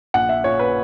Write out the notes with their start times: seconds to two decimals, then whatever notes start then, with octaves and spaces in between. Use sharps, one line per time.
0.14 A#1 F#5
0.29 E5
0.44 A#2 C#5
0.59 B4